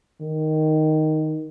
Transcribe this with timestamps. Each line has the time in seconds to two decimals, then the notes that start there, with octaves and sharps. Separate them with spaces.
0.21 D#3